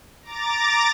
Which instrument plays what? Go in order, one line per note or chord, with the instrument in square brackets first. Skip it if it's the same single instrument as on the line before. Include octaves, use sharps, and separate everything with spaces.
[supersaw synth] A#5 D6 A6